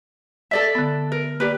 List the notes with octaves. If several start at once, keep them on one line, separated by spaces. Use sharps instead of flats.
A4 D5 E5
D3 B3
A#4
A#3 G4 B4 D5